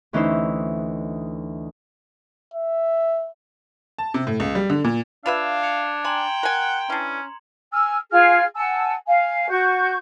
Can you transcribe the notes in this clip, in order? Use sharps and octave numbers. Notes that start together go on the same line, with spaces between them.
D2 E3 C#4 D#4 C5 E6
E5
A5
C3
A2
C#2
G3
D3
A#2
D4 F4 B4 E5 F5 G#6 E7 F7
G#6 C#7 F7
G5 G#5 A#5 C6 F#7
A#4 F#5 G#5
E3 C#4 D4
G#5 E6 F6
F4 G#4 F5 F6
F#5 G#5 A5 E6
F5 G#5
F#4 C#6 G6